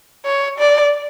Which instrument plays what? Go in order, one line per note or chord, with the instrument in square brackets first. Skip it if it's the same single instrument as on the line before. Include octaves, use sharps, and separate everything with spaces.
[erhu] C#5
D5